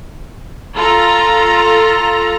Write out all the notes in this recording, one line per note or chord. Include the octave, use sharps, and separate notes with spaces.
F4 A4 A#5